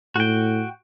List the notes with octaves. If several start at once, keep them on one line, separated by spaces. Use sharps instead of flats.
A2 F#4 G5